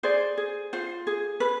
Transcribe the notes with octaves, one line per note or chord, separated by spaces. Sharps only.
G#4 C5 D5
G#4
F4 C5
G#4
B4